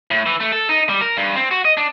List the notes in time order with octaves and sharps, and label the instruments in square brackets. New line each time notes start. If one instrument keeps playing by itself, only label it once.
[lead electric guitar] A2
E3
A3
A4
D#4
G3
A#4
G2
C4
F#4
D#5
D4